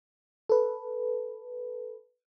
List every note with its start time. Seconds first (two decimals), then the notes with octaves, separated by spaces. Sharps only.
0.49 A4 B4